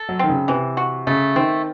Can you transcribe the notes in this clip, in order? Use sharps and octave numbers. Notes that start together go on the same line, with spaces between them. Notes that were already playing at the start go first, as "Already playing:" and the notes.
Already playing: A4
F#3
D#3 C4
C#3
C3 E3
F#4
C#3 A3
D#3 C4